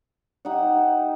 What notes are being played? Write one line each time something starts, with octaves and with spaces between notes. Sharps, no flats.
D#4 G4 E5 F#5